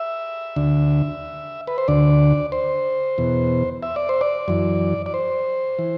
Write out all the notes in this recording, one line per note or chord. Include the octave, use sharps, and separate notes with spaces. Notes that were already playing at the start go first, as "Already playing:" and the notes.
Already playing: E5
D2 D3
B4
C5
D2 D3 D5
C5
E2 B2
E5
D5
C5
D5
F#2 E3
D5
C5
E3